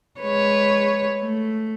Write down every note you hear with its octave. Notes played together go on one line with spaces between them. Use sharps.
G#3 B4 C#5
A3